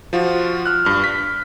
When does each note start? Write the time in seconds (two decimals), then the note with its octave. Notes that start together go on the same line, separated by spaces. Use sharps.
0.13 F3 F4 F#4
0.65 F6 F#6
0.85 G2 F6
1.04 B6